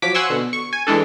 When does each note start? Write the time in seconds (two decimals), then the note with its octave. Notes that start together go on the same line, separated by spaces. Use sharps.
0.02 F3 F#3 D6 B6
0.15 F#5 G#5 C6 C#6 E6
0.30 B2 D3
0.53 C#6
0.73 G#5
0.87 E3 G#3 D4 A4